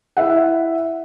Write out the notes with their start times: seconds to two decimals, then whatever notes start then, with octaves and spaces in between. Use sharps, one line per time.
0.17 E4 E5 F#5